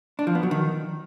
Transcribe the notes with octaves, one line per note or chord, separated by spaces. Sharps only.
D4
F3
B3
F#3
D#3